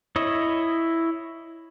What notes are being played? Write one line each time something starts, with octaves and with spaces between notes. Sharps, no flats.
E4 C#5 D#5